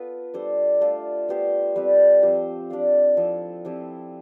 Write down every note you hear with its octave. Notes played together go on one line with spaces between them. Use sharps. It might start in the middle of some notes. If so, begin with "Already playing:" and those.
Already playing: B3 F4 A4 B4
G3 D4 A4 C5
A3 D4 F4
B3 D4 G4 C5
G3 C4 G4 B4
F3 C4 G4 C5
D4 G4 D5 F5
F3 C4 E4 A4
F3 C4 E4 G4